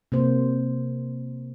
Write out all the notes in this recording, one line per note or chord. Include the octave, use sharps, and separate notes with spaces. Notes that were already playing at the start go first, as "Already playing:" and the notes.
C3 A#3 C5